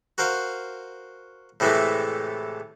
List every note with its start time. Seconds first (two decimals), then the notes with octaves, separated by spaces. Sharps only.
0.18 F#4 A#4 C5 F5
1.60 A2 C3 E3 G#3 A3